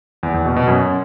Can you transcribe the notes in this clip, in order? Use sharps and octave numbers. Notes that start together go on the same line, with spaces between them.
E2
E2
B2
B2
F#2